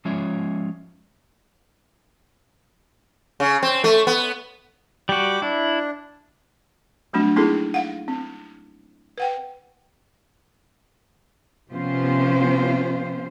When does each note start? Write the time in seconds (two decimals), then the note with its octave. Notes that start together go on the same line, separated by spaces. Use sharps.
0.05 F3 G#3 C#4 F4 C#5 E5
3.40 C#3
3.63 C4
3.84 A3
4.07 B3
5.09 G3 F#4 G5 D6
5.42 D4 E4
7.13 F#3 G3 A3 C4 D4 F#4
7.36 A#3 C4 D#4 E4 G#4 A4
7.74 F5 F#5
8.08 C4
9.18 B4 F#5 G5
11.72 C3 F3 B3 C#4 F4 C5